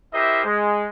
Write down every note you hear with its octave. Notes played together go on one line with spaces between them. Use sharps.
E4 G4 A#4 C5 D#5 E5
G#3